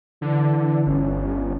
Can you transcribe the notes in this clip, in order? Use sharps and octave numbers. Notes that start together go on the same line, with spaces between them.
D3 E3
G1 C#4